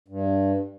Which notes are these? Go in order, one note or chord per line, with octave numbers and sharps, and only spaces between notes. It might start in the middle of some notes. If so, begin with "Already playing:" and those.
G2